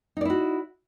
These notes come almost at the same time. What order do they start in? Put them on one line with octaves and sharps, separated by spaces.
D#4 D5 E4 F#4